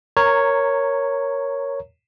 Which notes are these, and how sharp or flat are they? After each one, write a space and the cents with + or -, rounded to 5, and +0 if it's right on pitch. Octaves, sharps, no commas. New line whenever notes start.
A#4 +0 C#5 +0 A#5 -20